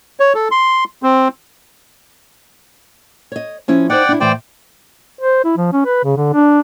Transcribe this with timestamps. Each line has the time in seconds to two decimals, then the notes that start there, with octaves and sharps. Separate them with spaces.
0.20 C#5
0.35 A4
0.51 C6
1.03 C4
3.32 C#5 D#5
3.68 F3 C#4 E4
3.90 D#4 C5 D5 F#5 G5
4.09 D4 E4
4.20 A2 E3 C5 D5 G5
5.21 C5
5.45 E4
5.57 F3
5.73 C#4
5.85 B4
6.04 C#3
6.17 D3
6.34 D4